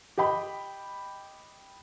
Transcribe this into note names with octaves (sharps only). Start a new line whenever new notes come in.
G4 D#5 G5 B5